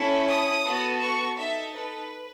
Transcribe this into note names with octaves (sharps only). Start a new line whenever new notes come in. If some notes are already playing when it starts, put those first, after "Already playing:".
Already playing: C#4 E4 A4
D#6
B3 F#4 A4
C#6
D#4 A4 E5
B4